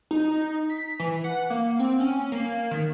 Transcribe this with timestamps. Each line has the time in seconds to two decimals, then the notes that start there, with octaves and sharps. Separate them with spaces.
0.11 D#4
0.70 B6
1.00 E3
1.24 F#5
1.50 A#3
1.79 C4
2.00 C#4
2.32 A#3
2.71 D#3